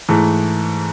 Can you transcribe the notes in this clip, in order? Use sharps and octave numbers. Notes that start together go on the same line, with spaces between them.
G#2 E3 A3